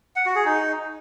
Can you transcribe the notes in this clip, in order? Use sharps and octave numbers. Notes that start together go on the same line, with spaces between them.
F#5
F#4
G#4
D#4